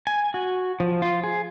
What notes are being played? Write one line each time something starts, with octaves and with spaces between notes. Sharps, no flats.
G#5
F#4
F3
F4
G#4